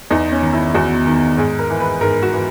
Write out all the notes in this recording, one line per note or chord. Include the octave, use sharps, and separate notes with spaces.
E2 D#4
C#4
D#3
E4
E2 F#4
D#3
G#2 G#4
A#4
E3
B4
G#2 A#4
F#4
E3